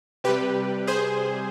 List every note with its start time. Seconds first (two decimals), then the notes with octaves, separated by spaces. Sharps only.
0.24 C3 G3 G4 B4
0.87 G#4 C5